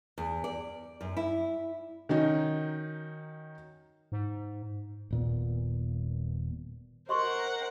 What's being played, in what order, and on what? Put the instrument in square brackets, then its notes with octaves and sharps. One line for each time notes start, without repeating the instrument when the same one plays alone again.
[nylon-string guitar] E2
D5
F#2
E4
[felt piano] D#3 F#3 C#4 D#4
[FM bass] G#2
[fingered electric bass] D#1 A#2 B3
[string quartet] A#4 C5 F#5 [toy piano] D#5 C6 C#6